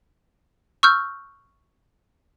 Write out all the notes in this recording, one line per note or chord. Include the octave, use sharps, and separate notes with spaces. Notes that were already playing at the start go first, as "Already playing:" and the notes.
C#6 E6 F6 G6